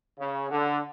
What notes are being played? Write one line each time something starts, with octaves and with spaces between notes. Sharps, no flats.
C#3
D3